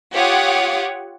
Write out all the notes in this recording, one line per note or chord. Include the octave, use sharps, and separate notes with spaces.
F4 G4 C#5 F#5 D6 D#6